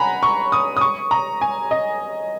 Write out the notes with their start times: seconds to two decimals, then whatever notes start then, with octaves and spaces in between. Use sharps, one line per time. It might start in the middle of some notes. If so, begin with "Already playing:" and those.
Already playing: F#5 G#5 A#5 B5
0.23 C#6
0.52 D#6
0.77 D#6
0.81 C#6
1.11 A#5
1.41 G#5
1.71 D#5